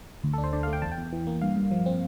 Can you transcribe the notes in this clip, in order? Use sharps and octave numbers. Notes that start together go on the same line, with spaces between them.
D2
A4
D4
C5
D3 D5
F5
A3
G5
E2 A5
G5
E2
E3
A#3
G2 F5
G2
F3
C4